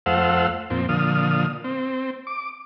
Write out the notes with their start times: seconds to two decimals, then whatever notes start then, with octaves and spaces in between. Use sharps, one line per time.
0.06 F2 A3 C5 F5 F#5 E6
0.70 F2 A#2 C4
0.89 A#2 D3 F3 D#6 F6
1.64 C4
2.27 D6